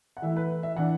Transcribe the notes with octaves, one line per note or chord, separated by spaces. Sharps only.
F#5
E3 A3 E4 E5
B4
E5
E3 D4 F#5